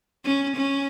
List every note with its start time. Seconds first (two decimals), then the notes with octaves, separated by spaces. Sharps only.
0.25 C#4
0.56 C#4